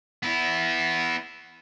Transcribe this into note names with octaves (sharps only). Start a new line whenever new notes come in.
B3 E4